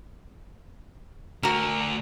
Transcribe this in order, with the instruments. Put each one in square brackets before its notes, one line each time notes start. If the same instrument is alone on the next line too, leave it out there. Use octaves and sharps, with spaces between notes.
[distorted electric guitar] D2 D3 [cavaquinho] F#4 A#4